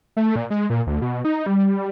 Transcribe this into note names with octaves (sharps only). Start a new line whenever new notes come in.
A3
A#2
G#3
A#2
D2
B2
D#4
G3